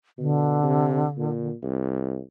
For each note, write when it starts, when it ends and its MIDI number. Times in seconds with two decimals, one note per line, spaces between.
0.18 0.58 47
0.18 1.49 50
0.63 1.04 48
1.18 1.54 46
1.62 2.20 36